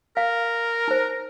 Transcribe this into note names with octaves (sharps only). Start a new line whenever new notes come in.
A#4 F5
D#4 C5